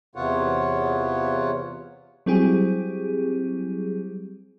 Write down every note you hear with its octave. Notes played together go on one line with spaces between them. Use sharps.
E2 C3 B3 F4 C#5 F#5
F#3 G3 C4 E4 G4 G#4